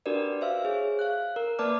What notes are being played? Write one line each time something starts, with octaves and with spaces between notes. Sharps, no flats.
D4 F#4 G4 A#4 B4 D5
C5 E5 F5 E6
G#4 C#5
F5 F#6
A#4
A#3 B4 D5 A5 D6 F6